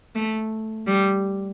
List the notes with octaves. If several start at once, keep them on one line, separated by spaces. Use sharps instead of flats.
A3
G3